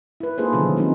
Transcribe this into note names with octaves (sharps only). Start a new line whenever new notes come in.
E4 B4
A#3 D#4 F4 G#4 A4 C5
B2 D3 D#3 F3 F#3 C#4
D#3 A3 C4 C#4 D#4